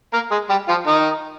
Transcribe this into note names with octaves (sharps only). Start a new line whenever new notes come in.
A#3 A#4
G#3 G#4
G3 G4
F3 F4
D#3 D#4